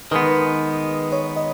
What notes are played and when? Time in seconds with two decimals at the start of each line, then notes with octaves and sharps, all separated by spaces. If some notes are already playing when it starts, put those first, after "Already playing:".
0.11 D#3 G#3 B3 B4
1.12 C#5
1.36 D#5